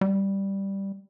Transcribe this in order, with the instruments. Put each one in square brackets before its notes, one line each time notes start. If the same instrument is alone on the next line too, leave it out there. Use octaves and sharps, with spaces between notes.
[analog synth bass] G3